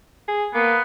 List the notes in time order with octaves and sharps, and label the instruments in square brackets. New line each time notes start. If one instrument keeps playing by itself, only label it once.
[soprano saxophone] G#4
[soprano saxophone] A#3 [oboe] B3